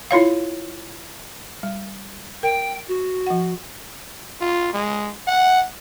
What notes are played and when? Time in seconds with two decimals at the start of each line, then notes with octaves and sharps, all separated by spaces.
0.11 E4 F4 C#5 F5
1.63 G3
2.43 A#4 G5
2.88 F#4
3.27 F3 F#5
4.41 F4
4.73 G#3
5.27 F#5